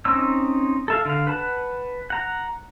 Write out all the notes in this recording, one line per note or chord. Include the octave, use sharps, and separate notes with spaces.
C4 C#4 D#4 E6
A4 E5 F5
D3 F5
B4 F#5 A5
F#5 A#5